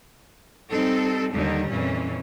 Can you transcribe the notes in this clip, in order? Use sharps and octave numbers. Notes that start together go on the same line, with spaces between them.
G3 C4 D#4 A4
D#2 D3 D#3 G3 D#4
F2 A#2 E3 C#4